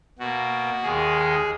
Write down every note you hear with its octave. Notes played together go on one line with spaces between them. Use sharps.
B2 A#3 F#4
D#2 D#3 G#3 G#4